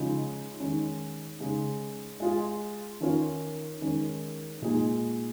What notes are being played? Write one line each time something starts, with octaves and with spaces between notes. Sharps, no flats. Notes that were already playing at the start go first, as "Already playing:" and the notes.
Already playing: C#3 F3 G#3 D#4
D#3 G#3 C#4
C#3 G#3 D#4 G#4
G#3 F4 G#4
D#3 C#4 F4 A#4
D#3 G#3 C#4 A#4
A#2 G#3 D#4 G#4